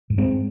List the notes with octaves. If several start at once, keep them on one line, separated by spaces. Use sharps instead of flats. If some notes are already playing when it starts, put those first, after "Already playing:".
G#2
G#3 C4